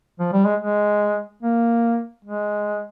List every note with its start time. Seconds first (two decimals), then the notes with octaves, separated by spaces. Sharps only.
0.20 F3
0.33 G3
0.46 G#3
0.61 G#3
1.43 A#3
2.25 G#3